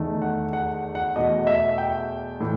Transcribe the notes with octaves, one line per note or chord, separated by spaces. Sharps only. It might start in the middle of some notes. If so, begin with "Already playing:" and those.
Already playing: E2 D#3 A3
F#5
F#5
F#5
E2 B2 A3 D#5
E5
G5
A2 E3